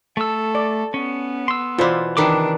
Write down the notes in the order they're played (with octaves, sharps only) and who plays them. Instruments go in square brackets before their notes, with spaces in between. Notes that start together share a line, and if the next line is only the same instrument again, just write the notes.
[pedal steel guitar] A3 E6 [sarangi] A4
[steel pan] D5
[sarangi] B3 [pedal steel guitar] C#4
[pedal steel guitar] C6 E6
[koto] B2 E3 [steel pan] F4 C5 D5
[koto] C3 D#3 E3 [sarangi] D4 [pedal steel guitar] D6